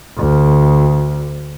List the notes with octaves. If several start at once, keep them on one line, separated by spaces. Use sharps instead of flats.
D2